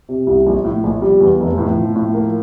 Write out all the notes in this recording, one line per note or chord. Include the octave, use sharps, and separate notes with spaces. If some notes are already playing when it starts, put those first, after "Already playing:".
C3
C2
A#1
A2
A#1
G3
E2
F1
A2
F3
A2
A#3